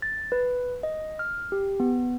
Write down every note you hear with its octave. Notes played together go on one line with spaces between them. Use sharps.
A6
B4
D#5
F6
G4
B3